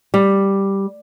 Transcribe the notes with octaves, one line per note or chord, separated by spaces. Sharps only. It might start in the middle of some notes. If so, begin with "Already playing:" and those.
G3